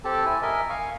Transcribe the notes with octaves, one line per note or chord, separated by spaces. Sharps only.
C4 G4 A4 A5
E4 G#5
A#4 D#5 E5 G#5
F5 G#5 C#6